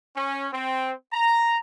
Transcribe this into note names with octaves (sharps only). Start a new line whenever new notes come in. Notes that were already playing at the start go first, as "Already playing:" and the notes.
C#4
C4
A#5